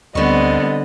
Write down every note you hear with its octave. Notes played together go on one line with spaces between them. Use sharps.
D2 D3 G3 B3 C4 D#5 C#6